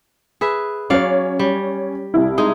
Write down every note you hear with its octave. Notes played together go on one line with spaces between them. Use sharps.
G#4 B4 E5
F#3 C#4 C#5 D5 F5
G3
C2 E4
G#3 D#4 G#4